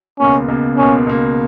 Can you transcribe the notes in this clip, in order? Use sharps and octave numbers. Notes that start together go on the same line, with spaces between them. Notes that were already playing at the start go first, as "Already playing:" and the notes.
C#2 B2 A#3 C#4
C#2 B2 A#3
C#2 B2 A#3 C#4
C#2 B2 A#3